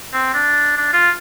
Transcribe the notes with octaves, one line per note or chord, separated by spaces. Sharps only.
C4
D4
D4
F4